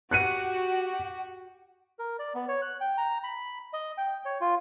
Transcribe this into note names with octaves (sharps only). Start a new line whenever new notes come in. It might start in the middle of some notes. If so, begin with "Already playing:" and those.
F#4 G4 F#5 F#6 C#7 D#7
A#4
D5
B3
C#5
F#6
G5
A#5
B5
D#5
G5
C#5
F4